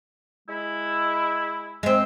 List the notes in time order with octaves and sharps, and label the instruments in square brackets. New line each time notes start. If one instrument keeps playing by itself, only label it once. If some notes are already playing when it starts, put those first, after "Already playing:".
[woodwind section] G#3 E4
[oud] G#3 C4